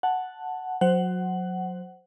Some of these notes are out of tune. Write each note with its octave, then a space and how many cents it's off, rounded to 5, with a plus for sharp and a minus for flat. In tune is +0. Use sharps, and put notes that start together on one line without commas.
F#5 +0 A5 +0
F#3 -25 C5 +0 F#5 +15